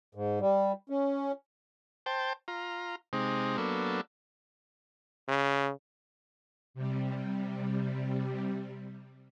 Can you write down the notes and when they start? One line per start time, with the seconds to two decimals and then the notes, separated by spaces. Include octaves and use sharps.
0.15 G#2
0.41 G3
0.90 C#4
2.06 C5 G5 A5
2.48 F4 A#5
3.13 C3 G#3 C4 D#4
3.58 F#3 A#3 B3 D4 A4
5.29 C#3
6.74 C3 G3